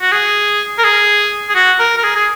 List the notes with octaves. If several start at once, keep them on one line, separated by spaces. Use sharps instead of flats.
F#4
G#4
A#4
G#4
G#4
F#4
A#4
A#4
G#4
G#4